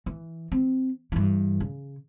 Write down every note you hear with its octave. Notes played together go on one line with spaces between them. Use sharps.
E3
C4
G2 E3
C#3